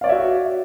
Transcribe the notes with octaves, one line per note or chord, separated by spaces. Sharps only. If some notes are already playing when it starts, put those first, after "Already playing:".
F#4 C#5 D5 E5 F5